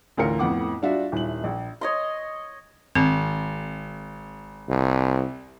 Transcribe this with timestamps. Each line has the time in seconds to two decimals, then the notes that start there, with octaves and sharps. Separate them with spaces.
0.17 A1 D2 F4 A#4 C#7
0.39 F2 A2 B3 F#5 D6
0.82 G3 D4 F4 F#4 E5
1.12 D#1 E4 F#7
1.44 A#1
1.81 C#5 D#5 C6
2.95 G#1 C4
4.69 C2